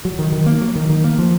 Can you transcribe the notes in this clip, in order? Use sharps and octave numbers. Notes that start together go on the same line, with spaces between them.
F#3
D#3
D#3
A#3
F#3
D#3
D#3
A#3
F3